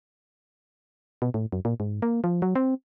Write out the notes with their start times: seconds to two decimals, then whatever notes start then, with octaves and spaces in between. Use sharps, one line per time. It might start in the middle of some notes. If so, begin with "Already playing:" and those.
1.22 B2
1.34 A2
1.52 F#2
1.65 A#2
1.80 G#2
2.02 A#3
2.24 F3
2.42 F#3
2.55 C4